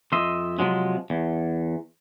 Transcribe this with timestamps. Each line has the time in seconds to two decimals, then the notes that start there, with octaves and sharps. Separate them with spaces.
0.12 F2 D#5 E5 C6
0.59 C3 F3 F#3 G#3
1.10 E2